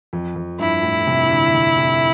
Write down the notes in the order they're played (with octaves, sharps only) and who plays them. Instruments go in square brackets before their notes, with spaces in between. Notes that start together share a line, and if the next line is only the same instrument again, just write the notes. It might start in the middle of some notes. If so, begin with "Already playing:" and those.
[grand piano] F2
F2
[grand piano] G2 [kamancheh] E4
[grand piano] A2
C3
D3
C3
C3